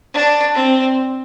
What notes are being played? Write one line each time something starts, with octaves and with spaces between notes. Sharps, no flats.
D4
C4